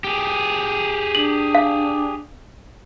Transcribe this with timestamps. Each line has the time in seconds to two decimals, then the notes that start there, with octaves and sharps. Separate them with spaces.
0.04 G4 G#4
1.15 D4 F#7
1.55 F5